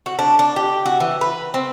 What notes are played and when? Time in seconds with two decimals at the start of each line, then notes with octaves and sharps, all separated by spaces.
0.06 F#4
0.19 D4
0.39 D4
0.56 G4
0.86 F#4
1.00 E3
1.21 B4
1.54 C4